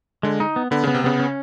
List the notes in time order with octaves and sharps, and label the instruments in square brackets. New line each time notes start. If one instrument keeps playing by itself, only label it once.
[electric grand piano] D3 [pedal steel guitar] G#3
[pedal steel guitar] D#4
B3
[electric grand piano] D3 [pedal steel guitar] B3
[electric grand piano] C#3 [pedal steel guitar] B3
[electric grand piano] C3
[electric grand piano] C#3 [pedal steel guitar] B3
[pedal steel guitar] C#4